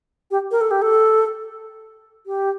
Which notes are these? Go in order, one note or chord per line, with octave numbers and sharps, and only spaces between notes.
G4
A#4
A4
G4
A4
G4